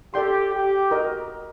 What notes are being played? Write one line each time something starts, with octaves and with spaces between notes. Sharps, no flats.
G4 A4 D5 G5 C6
G4
F#4 A#4 D#5